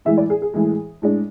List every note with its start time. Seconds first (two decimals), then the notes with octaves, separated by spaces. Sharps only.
0.05 A2 E3 G#3 E5
0.18 D5
0.30 G#4
0.42 G#4
0.54 A2 E3 G#3
1.02 A2 G#3 D4